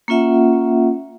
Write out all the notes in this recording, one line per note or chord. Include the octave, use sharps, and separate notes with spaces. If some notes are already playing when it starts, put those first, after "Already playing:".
A#3 C#4 F4 E5 F#5